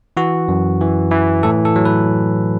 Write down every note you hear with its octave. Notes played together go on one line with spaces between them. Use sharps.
E3 F#4
F#2
E3
E3
A2 A4
A4
F#3
B4